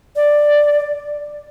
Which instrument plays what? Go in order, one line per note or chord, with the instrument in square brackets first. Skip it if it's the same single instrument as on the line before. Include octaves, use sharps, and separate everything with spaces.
[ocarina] D5